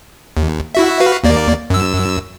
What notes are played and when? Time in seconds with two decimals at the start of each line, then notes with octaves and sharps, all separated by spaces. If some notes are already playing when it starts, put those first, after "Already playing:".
0.37 D#2
0.75 E4 F#4 E5
1.00 F#4 B4 F5
1.24 D#2 A#3 D5
1.70 F#2 E6